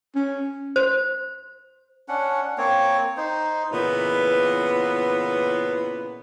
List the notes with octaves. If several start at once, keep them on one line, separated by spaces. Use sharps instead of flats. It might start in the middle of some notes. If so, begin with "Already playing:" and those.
C#4
C5
C#4 D4 F#5
A#3 C4 C#5
D#4 C5
A#2 C#3 E3 B3